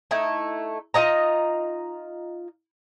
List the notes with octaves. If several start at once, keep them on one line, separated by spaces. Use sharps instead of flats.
A3 D#4 E4
D#4 F4 D#5 A#5